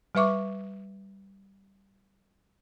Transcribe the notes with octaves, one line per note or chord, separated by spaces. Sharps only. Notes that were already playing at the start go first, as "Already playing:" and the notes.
G3 B4 E5 C#6 D6